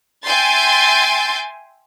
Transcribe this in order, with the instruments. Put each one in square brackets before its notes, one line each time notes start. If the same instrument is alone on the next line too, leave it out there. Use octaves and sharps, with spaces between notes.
[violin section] E5 G5 G#5 C6 G6 A6